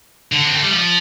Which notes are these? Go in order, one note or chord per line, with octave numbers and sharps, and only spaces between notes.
D3
C4
A3
G3
F3